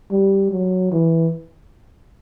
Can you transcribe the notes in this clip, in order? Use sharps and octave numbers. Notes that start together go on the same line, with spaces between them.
G3
F#3
E3